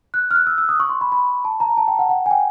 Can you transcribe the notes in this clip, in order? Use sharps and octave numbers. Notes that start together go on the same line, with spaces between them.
F#6
F6
F#6
E6
E6
D#6
C#6
C6
B5
B5
A5
A#5
A5
G5
F#5
F#5
G#5
G5